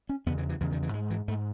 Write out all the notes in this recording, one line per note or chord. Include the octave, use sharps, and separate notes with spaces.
C#4
E2 C#3 B3
E3
E3
E2 C#3 E3
D#3
E3
G#2 G#3
E3
G#2 A3